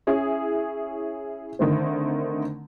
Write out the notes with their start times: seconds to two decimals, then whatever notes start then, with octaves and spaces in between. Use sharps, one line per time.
0.07 C#4 E4 G#4
1.59 D3 D#3 A3 C4